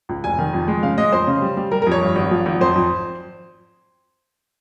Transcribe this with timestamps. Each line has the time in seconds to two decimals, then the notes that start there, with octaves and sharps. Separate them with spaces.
0.09 C#2
0.24 F1 G#5
0.39 D#3
0.53 F2
0.68 G#3
0.83 C#3 F5
0.98 G#3 D#5
1.13 F2 C5
1.27 C#3
1.42 G3
1.57 G3
1.72 G3 A#4
1.82 A#4
1.87 F2 C#5
2.01 G2
2.16 G#1
2.31 F3
2.46 G#1
2.61 F2 C5
2.75 F2